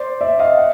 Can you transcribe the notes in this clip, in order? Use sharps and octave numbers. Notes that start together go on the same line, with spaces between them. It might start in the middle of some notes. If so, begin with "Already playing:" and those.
Already playing: C5 D5
D5 E5
D#5 F5
E5 F#5